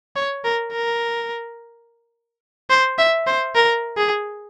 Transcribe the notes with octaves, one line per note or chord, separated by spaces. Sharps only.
C#5
A#4
A#4
C5
E5
C5
A#4
G#4